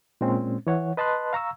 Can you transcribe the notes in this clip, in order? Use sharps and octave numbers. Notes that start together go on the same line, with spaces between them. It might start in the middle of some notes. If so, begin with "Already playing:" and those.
A#2 G#3 C4 C#4
E3 C#5 F#5
B4 D#5 A5 B5 C6 F#6
F5 A#5 C#6 E6